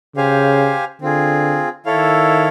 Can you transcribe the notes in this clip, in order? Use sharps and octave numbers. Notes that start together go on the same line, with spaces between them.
C#3 G4 C5 F5 G#5
D3 C4 F4 G#4
D#3 E4 A4 C#5 F5